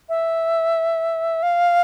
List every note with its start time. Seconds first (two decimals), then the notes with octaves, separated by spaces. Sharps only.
0.09 E5
1.43 F5